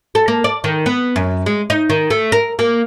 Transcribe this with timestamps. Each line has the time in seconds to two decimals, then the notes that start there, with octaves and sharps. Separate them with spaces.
0.15 A4
0.28 A#3
0.44 D5
0.64 D#3
0.86 B3
1.16 F#2
1.46 G#3
1.70 D#4
1.90 D#3
2.10 A3
2.32 A#4
2.59 A#3